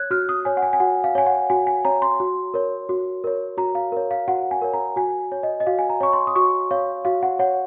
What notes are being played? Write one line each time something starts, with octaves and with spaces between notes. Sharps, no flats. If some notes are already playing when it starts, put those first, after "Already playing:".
Already playing: C#5 F#6 G#6
F#4 F6
D#6
C#5 G#5
F#5
G#5
G#5
F#4 F#5
F5
C#5 G#5
F#5
F#4 G#5
G#5
C#5 A#5
C6
F#4
A#4 C#5
F#4
A#4 C#5
F#4 A#5
F5
A#4 C#5
F5
F#4 F#5
G#5
A#4 C#5
A#5
F#4 G#5
C#5
D#5
D#5
F#4 F5
G#5
A#5
C#5 C#6
C6
D#6
F#4 C#6
C#5 F5
F#4 F5
F#5
C#5 F#5